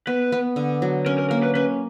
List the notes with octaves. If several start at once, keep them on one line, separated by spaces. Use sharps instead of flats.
B3 B4
B3
D3
F#3
C#4 A#4
A#4
A#3 A#4
B4
C#4 B4